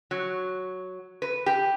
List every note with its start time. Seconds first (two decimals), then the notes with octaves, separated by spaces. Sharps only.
0.11 F#3
1.22 B4
1.46 G4